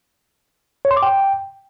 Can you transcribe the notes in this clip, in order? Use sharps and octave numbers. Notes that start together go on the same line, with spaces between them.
C#5
C6
D6
G5